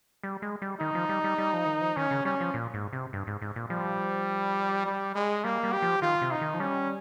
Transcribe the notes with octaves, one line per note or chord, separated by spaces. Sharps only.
G3
G#3
G3
D#3 D#4
F3
G3
G3
G3
F3
D#3
F3
D#3 C#4
C#3
G3 C#4
F3
A#2
G#2
C3
G2
G#2
G#2
A#2
F3 G3
G3
G#3
G3 A#3
G3
G4
F3
D#3 F4
C3
D#4
D#3
F3
G3 C#4